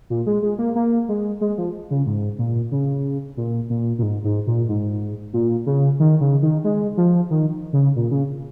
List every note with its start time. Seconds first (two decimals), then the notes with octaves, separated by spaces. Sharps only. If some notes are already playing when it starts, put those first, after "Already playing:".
0.10 A#2
0.27 G#3
0.42 G#3
0.58 A#3
0.75 A#3
1.09 G#3
1.41 G#3
1.58 F3
1.91 C#3
2.06 G#2
2.39 A#2
2.72 C#3
3.37 A#2
3.70 A#2
3.99 A#2
4.03 G#2
4.24 G#2
4.47 A#2
4.69 G#2
5.33 A#2
5.66 C#3
6.00 D#3
6.21 C#3
6.42 D#3
6.64 G#3
6.97 F3
7.30 D#3
7.73 C#3
7.96 A#2
8.11 C#3